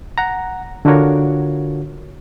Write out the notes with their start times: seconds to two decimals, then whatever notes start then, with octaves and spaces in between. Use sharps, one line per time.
0.18 F#5 A#5
0.85 D3 D4 F4 F#4 A#4 C#5